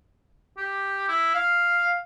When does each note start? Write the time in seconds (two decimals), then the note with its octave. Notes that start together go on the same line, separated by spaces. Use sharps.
0.57 G4
1.09 E4
1.35 F5